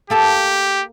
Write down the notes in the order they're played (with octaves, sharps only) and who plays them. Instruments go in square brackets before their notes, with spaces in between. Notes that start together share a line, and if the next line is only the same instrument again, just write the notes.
[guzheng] A#3 A4 A5 [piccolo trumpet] G4